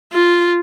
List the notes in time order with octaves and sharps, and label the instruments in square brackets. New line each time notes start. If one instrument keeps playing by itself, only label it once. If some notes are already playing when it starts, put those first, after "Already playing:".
[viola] F4